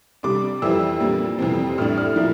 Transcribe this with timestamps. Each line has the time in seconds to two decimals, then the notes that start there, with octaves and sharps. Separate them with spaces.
0.23 C3 G3 D4 D6
0.62 F2 E3 G3 C4 E4 E6
1.00 A#2 G3 A#3 D4
1.39 F2 C3 E3 G3 C4
1.78 A2 G3 D4 F6
1.98 F6
2.16 A#2 F3 A#3 E4